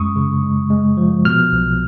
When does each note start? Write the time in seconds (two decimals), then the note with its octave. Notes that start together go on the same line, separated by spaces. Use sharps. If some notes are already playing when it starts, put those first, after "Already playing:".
Already playing: F#2 G#3 C#6 D#6
0.16 C#3
0.43 G#3
0.70 G#3
0.97 F3
1.25 B2 F6
1.52 B1